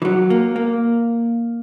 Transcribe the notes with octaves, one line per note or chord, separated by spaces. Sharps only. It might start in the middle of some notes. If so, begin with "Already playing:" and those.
E3
F#3
A#3
A#3